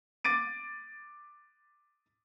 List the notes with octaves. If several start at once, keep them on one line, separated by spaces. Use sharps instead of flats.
D6 A6 D7 D#7